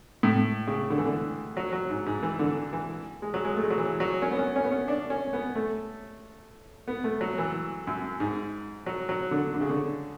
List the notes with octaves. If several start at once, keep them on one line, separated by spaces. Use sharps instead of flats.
A2
C#3
D3
E3
D3
F#3
F#3
G#2
G#2
E3
D3
E3
G#3
F#3
G#3
A3
G#3
F#3
E3
F#3
C#4
B3
C#4
C#4
B3
C#4
D4
C#4
B3
A3
B3
A3
F#3
E3
F#2
G#2
F#3
F#3
D3
D3
C#3
D3